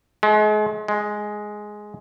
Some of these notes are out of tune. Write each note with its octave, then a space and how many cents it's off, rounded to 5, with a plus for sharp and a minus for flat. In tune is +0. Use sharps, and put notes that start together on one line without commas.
G#3 +35
G#3 +5